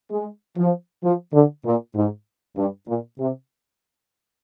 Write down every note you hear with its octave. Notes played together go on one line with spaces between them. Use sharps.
G#3
F3
F3
D3
A#2
G#2
G2
A#2
C3